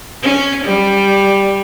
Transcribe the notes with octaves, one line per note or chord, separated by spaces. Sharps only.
C#4
G3